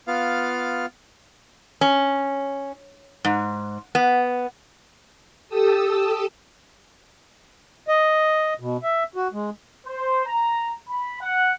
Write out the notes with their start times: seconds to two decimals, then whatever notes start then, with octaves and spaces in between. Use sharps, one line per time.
0.07 B3 F4 F5
1.81 C#4
3.25 G#2
3.95 B3
5.49 G4 A4 D#6 E6
7.88 D#5
8.60 B2
8.83 E5
9.16 F#4
9.33 G#3
9.86 C5
10.26 A#5
10.88 B5
11.21 F#5